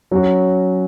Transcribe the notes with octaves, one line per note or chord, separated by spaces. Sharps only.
F#3 C#4 F#4